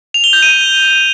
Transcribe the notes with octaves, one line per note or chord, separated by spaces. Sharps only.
F7
G7
G6
D#7